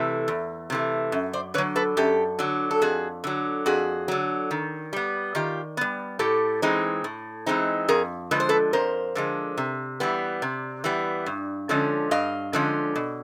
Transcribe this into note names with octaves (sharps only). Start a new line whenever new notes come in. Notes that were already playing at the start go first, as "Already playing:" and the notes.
Already playing: C3 E3 A3
E2
C3 E3 A3
F#2
C5 D5
D3 F#3 B4 C#5
A4 B4
F#2 G4 A4
D3 F#3
A4
F2 F#4 G#4
D3 F#3
F2 F#4 G#4
D3 F#3
D#3
G3 B3
D#3 F4 G4
G3 B3
A2 G4 A4
E3 G#3 C4 D#4
A2
E3 G#3 C4 D#4
F2 G#4 A#4
D3 F3 G#3 B4
C5
A4 B4
F2 A#4 C5
D3 F3 G#3
C3
E3 G3 B3
C3
E3 G3 B3
G2
D3 F3 G#3 C#4
G2 D#5 F5
D3 F3 G#3 C#4
B2